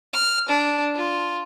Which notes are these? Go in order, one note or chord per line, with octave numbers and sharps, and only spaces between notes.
F6
D4
F4